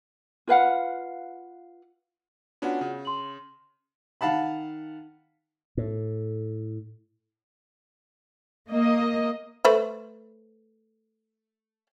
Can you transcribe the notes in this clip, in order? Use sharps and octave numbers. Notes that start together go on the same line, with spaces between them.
F4 B4 F5 F#5
B3 C#4 D4 F4 F#4 F#5
C#3
C6 F#7
D#3 F5 F#5 A5 B5
A2
A#3 D#5
A3 B4 C5